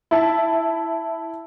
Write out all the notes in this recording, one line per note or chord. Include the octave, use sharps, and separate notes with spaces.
E4 E5 A5